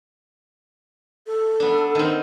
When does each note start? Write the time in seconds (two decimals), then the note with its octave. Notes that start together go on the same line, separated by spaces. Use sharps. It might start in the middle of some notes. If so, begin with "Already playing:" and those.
1.27 A4
1.60 B3 D4
1.95 D#3 C4